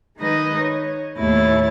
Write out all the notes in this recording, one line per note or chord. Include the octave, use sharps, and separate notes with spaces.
D#3 G#3 D#4 B4 D#5
C#5
D#2 A2 E4 C#5 A6